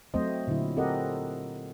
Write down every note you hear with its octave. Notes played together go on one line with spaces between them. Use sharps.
F#3 A3 C4 C5 D#5
A#2 D3 F#3 E4
C4 G4 A4 A#4 D#5 F#5